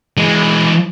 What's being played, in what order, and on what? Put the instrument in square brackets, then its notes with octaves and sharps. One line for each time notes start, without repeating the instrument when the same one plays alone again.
[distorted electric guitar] E3 G#3